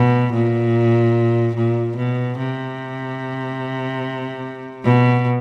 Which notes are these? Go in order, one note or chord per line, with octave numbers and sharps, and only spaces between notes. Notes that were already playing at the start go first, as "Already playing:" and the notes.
Already playing: B2
A#2
A#2
B2
C3
B2